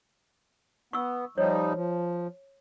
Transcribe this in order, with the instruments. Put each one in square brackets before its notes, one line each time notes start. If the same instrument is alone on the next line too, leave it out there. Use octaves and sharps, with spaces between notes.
[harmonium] B3 [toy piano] C#6 E6
[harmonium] F3 G3 D#4 [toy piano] C#5
[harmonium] F3